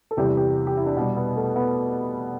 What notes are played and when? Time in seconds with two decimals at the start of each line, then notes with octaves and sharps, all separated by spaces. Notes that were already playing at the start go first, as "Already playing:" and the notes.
0.11 A4
0.17 E2 C3 E3 G3 G4
0.37 G4
0.67 G4
0.77 E4
0.86 D4
0.97 B2 G3
1.17 B3
1.36 A3
1.56 B3